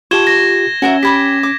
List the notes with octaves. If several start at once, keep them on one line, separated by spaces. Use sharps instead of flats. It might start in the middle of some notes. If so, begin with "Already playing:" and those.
F4 G4 A5 C#6 G#6 E7 G7
A#6
C#4 F#4 A#4 E5
G4 B5 D6 G#6 B6
D6